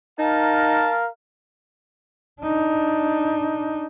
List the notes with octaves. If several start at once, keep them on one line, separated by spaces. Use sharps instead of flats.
D#4 A#4 F5 A5
D4 D#4